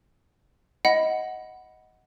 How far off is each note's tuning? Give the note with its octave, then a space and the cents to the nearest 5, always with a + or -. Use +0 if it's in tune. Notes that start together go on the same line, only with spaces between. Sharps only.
D#5 +15 F#5 +0 B5 +0